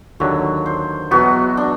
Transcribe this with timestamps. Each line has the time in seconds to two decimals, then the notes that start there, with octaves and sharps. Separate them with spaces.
0.20 D#2 D3 F#3 C#5
0.66 C5
1.11 E2 B2 F#3 B3 F#4
1.57 D4